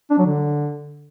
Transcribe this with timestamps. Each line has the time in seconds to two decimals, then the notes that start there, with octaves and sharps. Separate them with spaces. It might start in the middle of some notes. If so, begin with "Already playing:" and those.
0.10 D4
0.18 F#3
0.26 D3